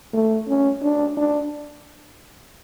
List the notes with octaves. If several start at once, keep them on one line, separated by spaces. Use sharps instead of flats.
A3
C#4
D4
D4